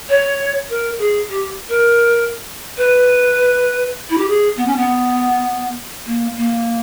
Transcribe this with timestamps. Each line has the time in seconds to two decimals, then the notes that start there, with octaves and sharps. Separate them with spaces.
0.09 C#5
0.70 A#4
0.98 G#4
1.29 G4
1.69 A#4
2.78 B4
4.10 E4
4.18 G4
4.27 G#4
4.57 B3
4.67 C#4
4.76 B3
6.06 A#3
6.37 A#3